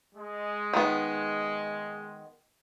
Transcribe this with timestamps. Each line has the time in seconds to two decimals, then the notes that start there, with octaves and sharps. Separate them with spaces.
0.15 G#3
0.74 D#3 B3